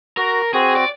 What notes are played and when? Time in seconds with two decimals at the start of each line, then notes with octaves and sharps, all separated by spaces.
0.17 F#4 A#4
0.53 C4 F#4 G#4
0.76 D5